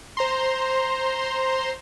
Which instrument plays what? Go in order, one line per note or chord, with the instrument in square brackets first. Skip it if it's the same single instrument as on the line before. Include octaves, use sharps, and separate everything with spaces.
[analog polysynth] C5 A#5 C6